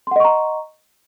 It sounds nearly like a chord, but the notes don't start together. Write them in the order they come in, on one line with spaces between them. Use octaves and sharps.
C6 F#5 D#5 C#6 A#5